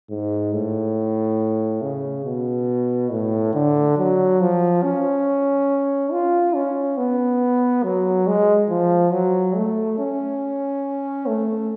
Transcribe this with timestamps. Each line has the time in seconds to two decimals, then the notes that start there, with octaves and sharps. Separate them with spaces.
0.10 G#2
0.54 A2
1.82 C#3
2.25 B2
3.11 A2
3.54 D3
3.97 F#3
4.41 F3
4.83 C#4
6.12 F4
6.55 C#4
6.98 B3
7.84 F#3
8.27 G#3
8.70 F3
9.13 F#3
9.56 A3
9.99 C#4
11.28 A3